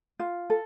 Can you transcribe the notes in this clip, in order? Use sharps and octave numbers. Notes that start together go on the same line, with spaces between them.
F4
A4